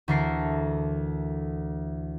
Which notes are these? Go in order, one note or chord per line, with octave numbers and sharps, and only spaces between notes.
D2 E3 A4 A#4 C7